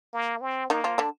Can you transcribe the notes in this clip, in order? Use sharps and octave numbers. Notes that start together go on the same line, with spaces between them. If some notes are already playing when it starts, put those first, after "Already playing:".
A#3
C4
D#3 A#3 D#4
F3 F4
D3 D4